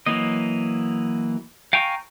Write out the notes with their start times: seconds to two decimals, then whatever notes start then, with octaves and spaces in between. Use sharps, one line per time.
0.06 E3 F#3 A#3 D#5
1.73 F5 G5 G#5 A#5 C#6